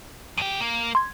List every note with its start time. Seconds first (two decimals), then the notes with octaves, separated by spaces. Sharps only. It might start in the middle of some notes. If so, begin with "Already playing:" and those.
0.38 E2 G4 D7 D#7
0.60 A#3
0.95 C6 G#6